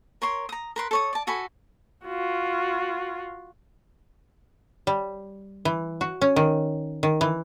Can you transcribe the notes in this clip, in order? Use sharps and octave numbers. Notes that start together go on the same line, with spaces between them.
A#4 C#5 C6
A#5 D#6
A#4 B4 C6
A4 C#5 D#6
D5 A5
F#4 A4 G#5 B5
F4 F#4
G3
E3
F#4
C#4
D#3
D#3
E3